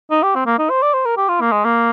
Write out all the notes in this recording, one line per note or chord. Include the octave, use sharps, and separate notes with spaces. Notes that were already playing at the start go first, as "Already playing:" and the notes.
D#4
G4
C4
A#3
D#4
C5
D5
C5
A#4
G4
F4
A#3
G#3
A#3